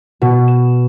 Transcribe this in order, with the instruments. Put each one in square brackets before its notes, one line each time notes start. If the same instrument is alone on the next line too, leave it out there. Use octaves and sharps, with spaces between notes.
[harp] B2
E7